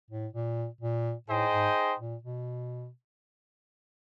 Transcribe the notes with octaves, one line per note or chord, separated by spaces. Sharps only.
A2
A#2
A#2
A2 D#4 G#4 C5 D#5 G5
G#2
A#2
B2